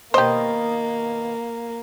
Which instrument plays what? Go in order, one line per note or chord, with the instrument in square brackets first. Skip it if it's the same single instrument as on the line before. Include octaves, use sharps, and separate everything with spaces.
[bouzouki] B2 D#3 D#5 [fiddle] A#3 [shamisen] G4 C5